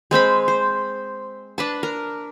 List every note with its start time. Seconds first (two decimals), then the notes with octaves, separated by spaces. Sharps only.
0.11 G#3 C4 C5 B5
0.48 C5
1.58 D4 B4 A5
1.83 A#4